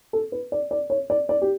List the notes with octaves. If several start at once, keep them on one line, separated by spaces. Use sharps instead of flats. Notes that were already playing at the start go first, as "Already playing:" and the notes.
A4
B4
D5
D5
C#5
D5
D5
G4